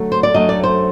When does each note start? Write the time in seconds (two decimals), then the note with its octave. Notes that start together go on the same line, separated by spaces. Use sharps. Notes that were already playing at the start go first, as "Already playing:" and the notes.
Already playing: D2 F#3 A3
0.12 C5
0.23 D5
0.34 F#2 F#3 A3 D4 D#5
0.49 D5
0.63 C5